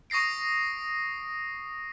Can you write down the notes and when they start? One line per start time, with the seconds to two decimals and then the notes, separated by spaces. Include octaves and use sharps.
0.10 C#6 D#6 A#6 C7 D7